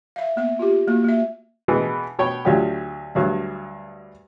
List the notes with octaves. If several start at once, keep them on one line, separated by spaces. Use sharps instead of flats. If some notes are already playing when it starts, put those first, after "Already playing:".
E5 F5
A#3 B3 E5
F4 G4
A#3 F#4
A#3 E5
B2 E3 G#3
B2 C#5 G5
D2 F#3 F4 G4
D2 G2 F#3